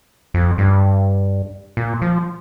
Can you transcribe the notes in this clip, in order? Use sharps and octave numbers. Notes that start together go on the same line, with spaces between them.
F2
G2
A#2
F3